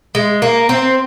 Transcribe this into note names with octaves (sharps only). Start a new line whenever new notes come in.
G#3
A#3
C4